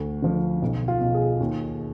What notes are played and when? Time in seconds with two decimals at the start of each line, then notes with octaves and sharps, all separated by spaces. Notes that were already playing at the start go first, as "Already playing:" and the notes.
Already playing: D2
0.22 D3 F3
0.62 B1
0.88 F4
1.01 B2
1.14 G#4
1.40 D#2